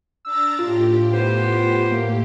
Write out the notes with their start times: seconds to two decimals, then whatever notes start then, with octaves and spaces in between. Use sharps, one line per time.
0.25 D4 A#5 E6 A6
0.59 A2 F4 G4
1.13 B3 C5
1.92 A#3